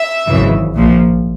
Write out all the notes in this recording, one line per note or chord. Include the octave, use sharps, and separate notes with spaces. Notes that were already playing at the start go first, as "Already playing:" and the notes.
Already playing: E5
G#1 F#2 C#3 E3
A#1 A#2 F3